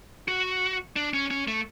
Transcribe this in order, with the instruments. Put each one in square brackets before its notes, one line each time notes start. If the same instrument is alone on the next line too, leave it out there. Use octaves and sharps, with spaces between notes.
[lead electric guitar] F#4
D4
C#4
C#4
A3